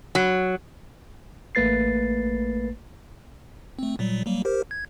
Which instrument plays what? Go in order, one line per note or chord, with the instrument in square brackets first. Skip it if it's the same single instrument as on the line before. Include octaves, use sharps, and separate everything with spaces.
[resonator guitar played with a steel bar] F#3
[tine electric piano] A1 A3 A#3 B4 A6 C7
[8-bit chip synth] A3 C4
A#2 F#3 G3
F#3 G3 A#3
G4 A#4 C5
G#6